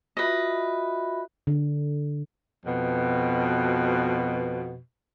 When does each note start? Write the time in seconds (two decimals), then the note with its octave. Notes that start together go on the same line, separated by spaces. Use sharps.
0.17 F4 F#4 B4 D#5 E5
1.47 D3
2.65 F2 B2